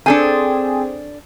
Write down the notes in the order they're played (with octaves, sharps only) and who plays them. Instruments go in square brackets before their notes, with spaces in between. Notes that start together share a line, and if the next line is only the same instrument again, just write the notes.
[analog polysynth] C4 G#4 [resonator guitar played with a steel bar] D4 A4 G#5